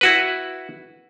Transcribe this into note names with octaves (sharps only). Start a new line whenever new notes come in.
E4 F#4 B4